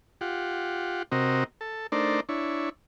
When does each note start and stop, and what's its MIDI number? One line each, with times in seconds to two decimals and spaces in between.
0.21 1.03 65
0.21 1.03 67
0.21 1.03 78
1.12 1.44 48
1.12 1.44 60
1.12 1.44 66
1.12 1.44 70
1.12 1.44 75
1.61 1.87 69
1.92 2.20 57
1.92 2.20 62
1.92 2.20 63
1.92 2.20 70
1.92 2.20 72
1.92 2.20 74
2.29 2.69 62
2.29 2.69 64
2.29 2.69 73